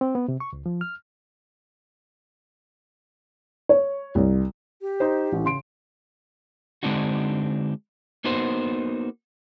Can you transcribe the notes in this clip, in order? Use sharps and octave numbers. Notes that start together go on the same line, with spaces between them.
C4
B3
C3
C#6
C#2
F3
F6
C#5
C2
G4
D#4 C5
A1 A2
C#3 C6 D7
D3 G#3 C4 D4 D#4 F#4
A#3 B3 D#4 F#4 C5